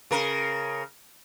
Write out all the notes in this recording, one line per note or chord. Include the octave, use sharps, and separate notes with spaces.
C#3 A#4